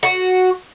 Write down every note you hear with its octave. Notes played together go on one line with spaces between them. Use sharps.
F#4